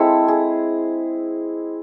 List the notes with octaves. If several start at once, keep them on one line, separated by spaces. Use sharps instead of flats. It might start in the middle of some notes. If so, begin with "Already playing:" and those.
Already playing: G#3 C4 E4 A4
G#4